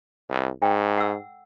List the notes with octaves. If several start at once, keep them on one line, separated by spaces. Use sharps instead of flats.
C2
G#2 G5
F#5 E6